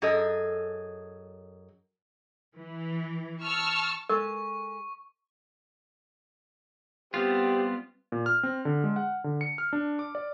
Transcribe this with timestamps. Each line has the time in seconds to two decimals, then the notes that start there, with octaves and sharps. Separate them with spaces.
0.02 F#2 G#4 A4 D#5
2.55 E3
3.42 A5 C#6 E6 F6
4.09 G#3 A4 A#4 C#6
7.14 G3 B3 C4 F4 G4
8.12 A#2
8.26 F6
8.43 C4
8.65 D3
8.84 G#3
8.96 F#5
9.24 D3
9.41 C#7
9.58 F6
9.73 D4
9.99 D6
10.15 D5